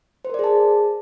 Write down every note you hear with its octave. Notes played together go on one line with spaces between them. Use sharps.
G#4 A#4 C5 D5 A5